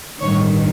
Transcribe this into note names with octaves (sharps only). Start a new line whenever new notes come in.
A1 G2 D#3 C#5